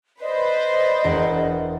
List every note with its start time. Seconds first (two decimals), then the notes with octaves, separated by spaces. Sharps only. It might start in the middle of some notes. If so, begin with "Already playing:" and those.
0.21 B4 C5 D5 D#5
1.04 E1 A#4 F#5